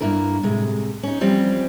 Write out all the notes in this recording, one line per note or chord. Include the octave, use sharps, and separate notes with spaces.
G2 A#3 E4 A#4
A2 C3 G#3
C#4 D#4
E3 F3 G3 C4 C#4